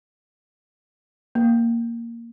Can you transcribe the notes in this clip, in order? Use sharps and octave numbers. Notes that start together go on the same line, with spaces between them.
A#3